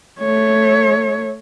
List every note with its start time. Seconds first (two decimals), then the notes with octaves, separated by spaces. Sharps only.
0.19 A3 C#5